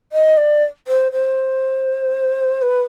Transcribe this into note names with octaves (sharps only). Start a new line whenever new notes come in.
D#5
D5
C5
C5
B4